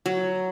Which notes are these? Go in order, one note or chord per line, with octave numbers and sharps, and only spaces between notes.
F#3